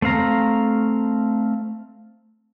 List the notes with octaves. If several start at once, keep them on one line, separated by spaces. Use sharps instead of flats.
A3 C4 F5 A#5